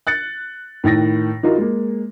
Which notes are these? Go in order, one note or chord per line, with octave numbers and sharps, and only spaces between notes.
F#6 A6 C#7
A2 D#3 A6 A#6
E3 D#4 F4 F#4 A#4
G#3 A#3